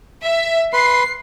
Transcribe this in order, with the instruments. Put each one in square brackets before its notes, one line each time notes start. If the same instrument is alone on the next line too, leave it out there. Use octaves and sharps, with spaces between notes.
[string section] E5
[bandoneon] B4 B5 C6 [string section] C7